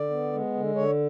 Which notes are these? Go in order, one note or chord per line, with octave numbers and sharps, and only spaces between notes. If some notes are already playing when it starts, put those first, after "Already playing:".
Already playing: D3 D5
B3
G#3
D3
D3 C#5